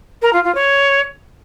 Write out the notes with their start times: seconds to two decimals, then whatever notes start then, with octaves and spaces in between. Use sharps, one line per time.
0.21 A#4
0.32 F4
0.43 F4
0.54 C#5